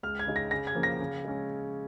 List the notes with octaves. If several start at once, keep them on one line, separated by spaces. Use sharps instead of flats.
C#2 F6
G#6
C#3 G#3 D#4
A#6
C#3 A#6
G#6
F3 A#3 C#4
A#6
C#3
G#3 C#4